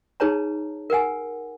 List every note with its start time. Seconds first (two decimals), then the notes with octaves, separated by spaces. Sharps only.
0.20 D#4 G#4 B4 C#5 A5 A#5
0.90 A#4 B4 F#5 G#5